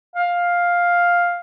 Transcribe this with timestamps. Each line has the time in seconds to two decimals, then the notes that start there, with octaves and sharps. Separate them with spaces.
0.15 F5